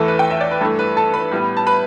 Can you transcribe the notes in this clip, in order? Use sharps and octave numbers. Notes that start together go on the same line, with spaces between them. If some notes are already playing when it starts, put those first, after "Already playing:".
Already playing: E2 E3 A3 A4
B4
G5
E5
D5
B4
G2 E3 A3 A4
B4
A4 A5
B4 B5
A2 G3 B3
A5
B4 B5